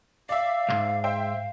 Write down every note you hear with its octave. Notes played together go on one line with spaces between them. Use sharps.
D5 E5 F5
B1 G#2
C5 E5 G5